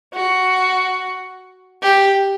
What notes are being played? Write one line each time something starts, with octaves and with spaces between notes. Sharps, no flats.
F#4
G4